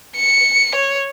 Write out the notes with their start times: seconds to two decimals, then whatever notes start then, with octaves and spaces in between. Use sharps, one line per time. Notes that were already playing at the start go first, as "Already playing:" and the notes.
0.16 C#7
0.75 C#5